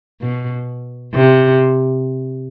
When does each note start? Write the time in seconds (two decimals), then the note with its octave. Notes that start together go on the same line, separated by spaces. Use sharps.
0.21 B2
1.14 C3